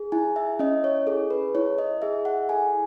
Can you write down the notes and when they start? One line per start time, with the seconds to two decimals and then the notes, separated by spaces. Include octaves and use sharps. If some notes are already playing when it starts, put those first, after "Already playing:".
Already playing: G#4
0.12 E4 G#5
0.36 E5
0.59 C#4 D#5
0.84 C#5
1.07 G#4 A4
1.31 B4
1.55 E4 C#5
1.78 D#5
2.02 G#4 E5
2.25 F#5
2.49 A4 G#5